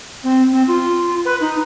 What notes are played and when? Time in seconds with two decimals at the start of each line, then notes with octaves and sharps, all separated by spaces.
0.23 C4
0.52 C4
0.67 F4
1.25 B4
1.40 D#4